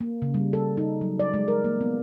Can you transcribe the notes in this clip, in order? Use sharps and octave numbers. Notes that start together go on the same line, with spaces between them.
A#3
C#3
G3
A4
D#4
F#3
D5
G#3
A#4
A#3
B3